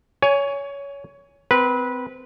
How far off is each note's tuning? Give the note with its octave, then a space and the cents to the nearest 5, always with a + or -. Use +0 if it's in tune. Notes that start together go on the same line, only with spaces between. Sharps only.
C#5 +20 G#5 +0
C4 -30 B4 -15